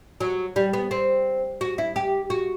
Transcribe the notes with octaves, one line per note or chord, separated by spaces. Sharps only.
F#3
G3
B3
C4
F#4
E4
G4
F#4